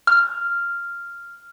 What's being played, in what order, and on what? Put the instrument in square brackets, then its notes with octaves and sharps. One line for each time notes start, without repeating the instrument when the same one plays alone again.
[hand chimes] F6